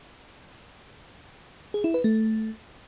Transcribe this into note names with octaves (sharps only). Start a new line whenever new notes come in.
G#4
E4
B4
A3